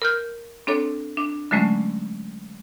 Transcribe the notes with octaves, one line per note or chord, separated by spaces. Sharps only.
A#4 F6 G6
C4 D4 A4 C#5
D4
D3 F#3 G#3 A3 C#4